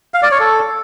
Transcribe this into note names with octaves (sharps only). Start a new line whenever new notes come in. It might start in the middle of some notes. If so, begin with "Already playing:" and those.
F5
D5
C#5
A4